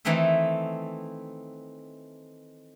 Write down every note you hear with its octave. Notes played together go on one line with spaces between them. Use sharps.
D#3 E3 A3 C4 D#4 E4